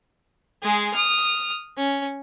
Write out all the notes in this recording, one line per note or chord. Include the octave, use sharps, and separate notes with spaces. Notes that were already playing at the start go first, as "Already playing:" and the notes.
G#3 G#4
D#6 F6
C#4